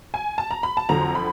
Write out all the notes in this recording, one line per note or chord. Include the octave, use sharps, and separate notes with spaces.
G#5
A5
A#5
B5
A5
F2 D3 F#3 A#5
B5